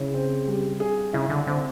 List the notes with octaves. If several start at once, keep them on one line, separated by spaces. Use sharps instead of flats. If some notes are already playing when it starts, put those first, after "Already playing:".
Already playing: C#3 E4
C4
G3
G#4
C#3 E4
D3
D3 C4